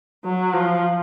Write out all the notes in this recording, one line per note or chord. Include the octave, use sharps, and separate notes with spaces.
F#3
F3